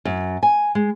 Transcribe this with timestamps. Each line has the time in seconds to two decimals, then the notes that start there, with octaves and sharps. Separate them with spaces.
0.05 F#2
0.43 G#5
0.75 G#3